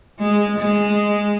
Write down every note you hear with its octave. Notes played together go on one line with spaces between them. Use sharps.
G#3
G#3